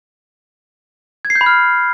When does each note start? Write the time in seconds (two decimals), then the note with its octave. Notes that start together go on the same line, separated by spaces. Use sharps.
1.25 G#6
1.30 C7
1.35 G6
1.41 B5
1.46 F6